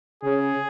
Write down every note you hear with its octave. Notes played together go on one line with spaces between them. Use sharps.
C#3 G#4